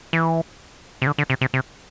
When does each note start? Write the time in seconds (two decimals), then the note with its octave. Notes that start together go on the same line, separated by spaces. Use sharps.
0.13 E3
1.02 C3
1.07 D3
1.18 D3
1.30 C3
1.41 C3
1.54 C3